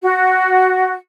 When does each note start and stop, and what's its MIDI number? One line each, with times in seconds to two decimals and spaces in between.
0.02 0.94 66